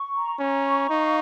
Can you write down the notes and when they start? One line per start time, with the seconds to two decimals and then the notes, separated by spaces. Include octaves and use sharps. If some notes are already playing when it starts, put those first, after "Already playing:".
Already playing: C#6
0.14 A#5
0.39 C#4 A#5
0.65 C#6
0.89 D#4 F5